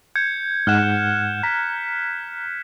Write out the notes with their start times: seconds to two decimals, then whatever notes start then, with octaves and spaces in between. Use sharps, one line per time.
0.16 G6 G#6 C#7
0.67 G#2 F#5 F6 F#6 E7
1.43 A#5 B6